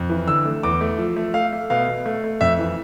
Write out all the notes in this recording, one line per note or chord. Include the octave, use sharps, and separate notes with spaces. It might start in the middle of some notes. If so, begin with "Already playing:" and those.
Already playing: F2
E3
D3 E6
A3
E2 D6
A3
F3
A3
A3 F5
A3
B2 F5
B2
A3
A3
F2 E5
E3